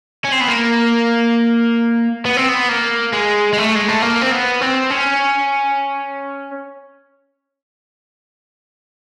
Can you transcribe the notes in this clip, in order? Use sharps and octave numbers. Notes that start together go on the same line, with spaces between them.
C#4
C4
B3
A#3
B3
C4
B3
A#3
G#3
G#3
A3
G#3
A3
A#3
C4
B3
C4
C#4